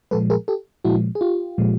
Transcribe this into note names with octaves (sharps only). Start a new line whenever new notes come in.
A#2 F3 G#3 A4 B4
G#4 A#4
G4 A4
A#2 F3 G#3 E4 F#4
G#4
F4 G4
A#2 F3 G#3